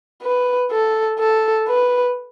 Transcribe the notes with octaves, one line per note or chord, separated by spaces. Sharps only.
B4
A4
A4
B4